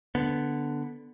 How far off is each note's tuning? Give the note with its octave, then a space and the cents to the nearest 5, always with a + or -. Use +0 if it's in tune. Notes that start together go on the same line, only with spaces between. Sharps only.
D3 +0 B3 +0